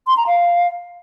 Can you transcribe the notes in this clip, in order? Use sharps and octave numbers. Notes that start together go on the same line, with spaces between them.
C6
A#5
F5